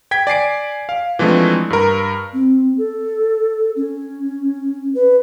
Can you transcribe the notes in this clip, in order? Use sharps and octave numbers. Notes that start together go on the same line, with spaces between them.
G5 G#6 B6
D5 G#5 C7 D7
F5
E3 F3 G#3 A3 C4 D4
G2 A#4
C4
A4
C#4
B4